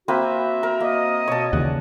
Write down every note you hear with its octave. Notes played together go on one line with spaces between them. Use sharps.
A#3 C4 F#4 B4 E5
A#4
A#3 D#5
B2 C#5 A5
D#2 C#3 E3 D5 F#5